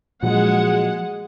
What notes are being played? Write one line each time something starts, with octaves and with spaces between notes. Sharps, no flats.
A#2 F3 F#3 G#3 F#5